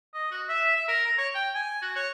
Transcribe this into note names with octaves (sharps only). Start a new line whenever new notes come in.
D#5
F#4
E5
E5
A#4
A#5
C#5
G5
G#5
F#4
C#5